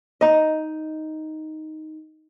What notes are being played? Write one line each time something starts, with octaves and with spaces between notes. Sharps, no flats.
D#4 D#5